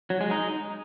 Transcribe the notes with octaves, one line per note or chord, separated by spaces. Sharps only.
F#3
G#3
D#4